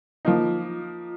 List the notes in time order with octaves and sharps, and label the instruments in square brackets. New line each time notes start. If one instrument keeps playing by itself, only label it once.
[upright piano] F3 A#3 D#4 [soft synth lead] F4